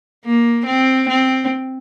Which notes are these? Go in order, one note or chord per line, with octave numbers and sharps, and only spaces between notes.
A#3
C4
C4